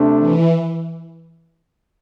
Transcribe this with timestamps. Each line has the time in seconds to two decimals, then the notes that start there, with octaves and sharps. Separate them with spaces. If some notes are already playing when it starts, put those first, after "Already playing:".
Already playing: C3 A3 D4
0.19 E3